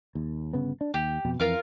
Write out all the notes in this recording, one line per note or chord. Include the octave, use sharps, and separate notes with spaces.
D#2
G1 C#3 B3
D4
D#2 G4
F2 B2
F2 E3 F4 A#4 F5